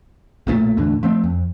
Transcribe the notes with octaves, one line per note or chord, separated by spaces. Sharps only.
B1 A#2 D3 A3
E2 A2 D3
F3 A3 C4
F2